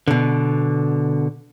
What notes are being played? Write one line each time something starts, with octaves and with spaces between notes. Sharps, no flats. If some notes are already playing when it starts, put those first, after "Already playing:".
B2 D3